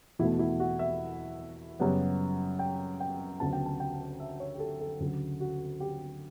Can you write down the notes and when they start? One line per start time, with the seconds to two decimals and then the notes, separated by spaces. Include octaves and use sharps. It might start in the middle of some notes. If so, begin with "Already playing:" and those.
0.19 E2 B2 A3 E4
0.39 E4
0.60 F#4
0.79 E5
1.80 F#2 C#3 G3 B3
2.59 G5
3.00 G5
3.40 D2 C#3 F#3 B3 A5
3.53 G5
3.66 A5
3.80 G5
4.20 E5
4.40 C#5
4.55 G4
4.60 A4
4.80 A4
5.00 D2 C#3 F#3
5.40 F#4
5.80 G4